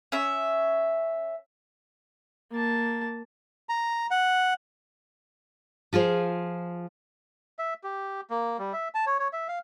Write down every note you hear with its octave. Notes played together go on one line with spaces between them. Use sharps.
C#4 E5
A#3 A5
A#5
F#5
F3 F4 G#4 C5
E5
G4
A#3
G3
E5
A5
C#5
C#5
E5
F5